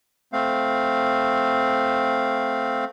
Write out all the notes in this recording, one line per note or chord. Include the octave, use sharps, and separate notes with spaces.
A3 C4 F5